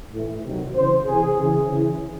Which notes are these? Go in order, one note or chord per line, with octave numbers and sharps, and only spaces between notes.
A2 E3
C3 D#3 F#3
C#3 E3 C5
C3 E3 G#4
C#3 E3
C#3 E3